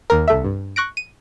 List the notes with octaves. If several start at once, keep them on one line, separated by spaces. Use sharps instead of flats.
D#2 A#4
C2 A4 E5
G2
C#6 F#6 A#6 D7
D#7